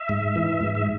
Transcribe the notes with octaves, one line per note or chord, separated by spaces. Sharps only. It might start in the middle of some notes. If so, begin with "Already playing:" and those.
Already playing: E5
G#2
E3
G#2
E5